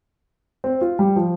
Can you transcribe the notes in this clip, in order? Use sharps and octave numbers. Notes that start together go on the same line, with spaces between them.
C4
F4
G3
F3